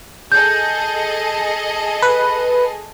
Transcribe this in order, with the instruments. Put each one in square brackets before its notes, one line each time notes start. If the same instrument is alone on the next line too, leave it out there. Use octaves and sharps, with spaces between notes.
[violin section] G#4 A4 D#5 [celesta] G6
[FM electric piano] B4